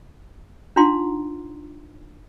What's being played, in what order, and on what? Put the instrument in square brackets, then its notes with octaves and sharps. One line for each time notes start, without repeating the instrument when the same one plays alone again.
[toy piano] D4 D#4 F4 F#5 A#5 C6